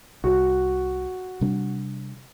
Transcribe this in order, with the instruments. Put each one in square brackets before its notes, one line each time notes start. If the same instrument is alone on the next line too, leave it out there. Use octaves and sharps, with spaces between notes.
[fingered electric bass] C2 [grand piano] F#4
[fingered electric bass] C3 G3 D4